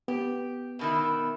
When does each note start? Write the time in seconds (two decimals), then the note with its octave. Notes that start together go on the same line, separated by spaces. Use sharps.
0.08 B3 G4
0.79 B2 D#3 E4